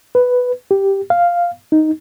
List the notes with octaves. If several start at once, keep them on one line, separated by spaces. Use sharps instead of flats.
B4
G4
F5
D#4